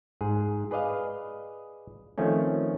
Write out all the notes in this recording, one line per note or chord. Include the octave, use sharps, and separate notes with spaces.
G#2 G#4
G#4 B4 D5 D#5 F5
D#3 F3 A3 C4 C#4